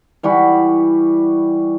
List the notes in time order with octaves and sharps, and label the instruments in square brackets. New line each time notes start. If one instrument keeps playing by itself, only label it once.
[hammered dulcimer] E3 G3 F#4 B5